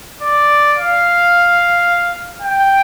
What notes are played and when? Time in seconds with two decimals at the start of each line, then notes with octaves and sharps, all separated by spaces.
0.22 D5
0.77 F5
2.42 G5